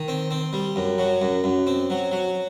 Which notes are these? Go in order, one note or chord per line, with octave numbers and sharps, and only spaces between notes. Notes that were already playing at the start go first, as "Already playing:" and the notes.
Already playing: D#3
C4
C4
G3
F#2
F#3
F#2
F#2
C4
F#3
F#3